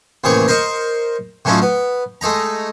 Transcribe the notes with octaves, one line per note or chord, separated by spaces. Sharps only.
A1 D#2 C3 G#4 C#5 C#6
A#4 C5 D#5 C#6
A2 F#3 A3 C#4 D#4 F4
B3
G#3 A3 D#4 A#5